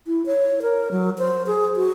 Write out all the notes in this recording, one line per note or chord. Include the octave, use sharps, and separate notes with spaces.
E4
C#5
A#4
F#3
C5
G#4
F#4